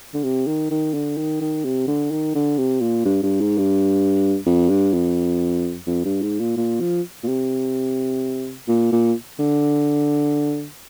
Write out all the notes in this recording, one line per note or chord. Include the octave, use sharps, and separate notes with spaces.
D3
C3
D#3
D#3
D3
D#3
D#3
C3
D3
D#3
D3
C3
A#2
G2
G2
G#2
G2
F2
G2
F2
F2
G2
G#2
A#2
A#2
F3
A#2
C3
A#2
A#2
D3